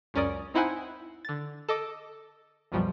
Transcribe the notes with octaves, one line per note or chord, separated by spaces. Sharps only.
C#2 F#2 C#4 A#4 D5 D#6
C4 D#4 E4 C5 F#5 G#5
D3 A6
A4 D#5 D6
C2 F#2 B2 F3 G3